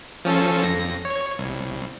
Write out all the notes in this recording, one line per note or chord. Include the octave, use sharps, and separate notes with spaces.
F3 C#4 A4
F2 A#6
C#5
C2